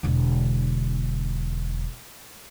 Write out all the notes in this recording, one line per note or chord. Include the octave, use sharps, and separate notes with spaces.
E1 D3